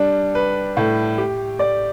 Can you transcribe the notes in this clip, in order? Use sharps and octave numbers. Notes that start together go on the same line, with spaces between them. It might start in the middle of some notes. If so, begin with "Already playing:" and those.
Already playing: G3 D4
B4
A2
G4
D5